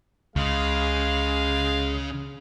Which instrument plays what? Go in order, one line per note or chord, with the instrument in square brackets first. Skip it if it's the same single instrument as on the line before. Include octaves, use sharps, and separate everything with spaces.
[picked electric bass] C#2 [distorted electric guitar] C#3 [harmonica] G#3 F5